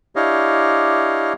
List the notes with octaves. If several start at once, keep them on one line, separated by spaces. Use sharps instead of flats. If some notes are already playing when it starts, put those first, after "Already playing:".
D4 E4 G4 C#5 D#5 F5